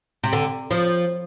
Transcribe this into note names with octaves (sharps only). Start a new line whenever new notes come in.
C3
D3
F3